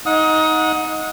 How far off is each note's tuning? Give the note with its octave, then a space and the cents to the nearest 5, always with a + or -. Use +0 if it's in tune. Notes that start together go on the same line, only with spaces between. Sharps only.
D#4 +15 F#5 -25 D#6 +20